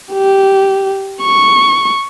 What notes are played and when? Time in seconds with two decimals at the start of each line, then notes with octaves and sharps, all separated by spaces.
0.13 G4
1.22 C#6